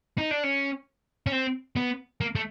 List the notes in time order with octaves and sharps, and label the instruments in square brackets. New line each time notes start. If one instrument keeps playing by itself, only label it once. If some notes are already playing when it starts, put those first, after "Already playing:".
[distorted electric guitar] D#4
D4
C#4
C#4
C4
B3
A#3
A3